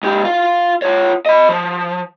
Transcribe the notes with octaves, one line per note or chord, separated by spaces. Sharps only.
G#2 G4
F4 F5
F4 C#5
D#5 B5
F3